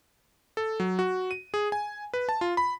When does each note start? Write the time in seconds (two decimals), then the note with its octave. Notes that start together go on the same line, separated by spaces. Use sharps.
0.57 A4
0.80 F#3
0.99 F#4
1.31 D#7
1.54 G#4
1.72 G#5
2.14 B4
2.29 A5
2.41 F4
2.57 B5